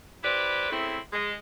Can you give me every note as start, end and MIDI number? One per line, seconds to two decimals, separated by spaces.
0.23 0.69 64
0.23 0.69 67
0.23 0.69 71
0.23 0.69 72
0.23 0.69 74
0.70 0.98 49
0.70 0.98 57
0.70 0.98 60
0.70 0.98 64
1.13 1.32 56